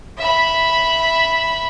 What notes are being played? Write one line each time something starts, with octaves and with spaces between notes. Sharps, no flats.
E5 B5